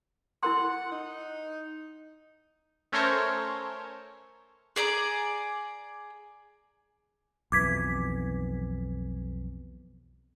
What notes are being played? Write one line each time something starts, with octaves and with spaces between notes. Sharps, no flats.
E4 A#4 F#5 C6
D#4
A3 C#4 A4 A#4 C5 C#5
G#4 D5 A#5
B1 F2 E3 D6 G#6 B6